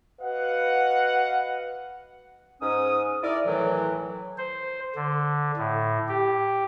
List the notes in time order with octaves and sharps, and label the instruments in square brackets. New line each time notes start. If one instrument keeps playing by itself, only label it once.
[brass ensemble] F#4 B4 D#5 F5 F#5
[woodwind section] G#2 C#4 D#6
E4 A#4 D5
A2 D#3 E3 F#3
[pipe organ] C5
D3
A2
G4